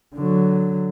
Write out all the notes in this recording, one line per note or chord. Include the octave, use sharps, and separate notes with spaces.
D3 F#3